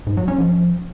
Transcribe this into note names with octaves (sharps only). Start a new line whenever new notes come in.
G#2
F#3
C#4
F3